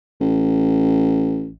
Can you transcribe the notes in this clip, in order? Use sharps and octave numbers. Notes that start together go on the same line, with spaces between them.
A1